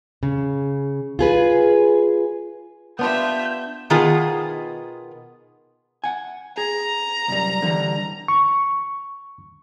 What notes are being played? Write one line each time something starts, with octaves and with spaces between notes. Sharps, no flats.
C#3
F4 G#4 B4
B3 D4 F4 G4 E5 G6
B2 D#3 B3 F4 G#4
F#5 G#5
G#4 A#5
C2 F#2 G3
D3 E3 G3
C#6